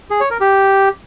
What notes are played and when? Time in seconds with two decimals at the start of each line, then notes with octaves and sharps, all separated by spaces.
0.10 G#4
0.21 C#5
0.31 A#4
0.41 G4